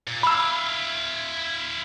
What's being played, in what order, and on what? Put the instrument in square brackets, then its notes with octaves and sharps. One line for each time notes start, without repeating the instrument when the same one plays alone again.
[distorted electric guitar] A#2
[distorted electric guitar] E4 F5 [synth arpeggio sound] B5 E6